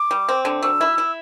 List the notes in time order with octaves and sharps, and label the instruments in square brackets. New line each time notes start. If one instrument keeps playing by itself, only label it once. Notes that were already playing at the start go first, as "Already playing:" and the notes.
Already playing: [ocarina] D6
[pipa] G3
C4
D3
[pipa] F#3 [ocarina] E6
[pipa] E4
E4